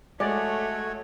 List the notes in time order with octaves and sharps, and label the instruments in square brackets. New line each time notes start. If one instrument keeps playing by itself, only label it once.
[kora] G#3 [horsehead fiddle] A3 [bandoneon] F#4 C#5 [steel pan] D5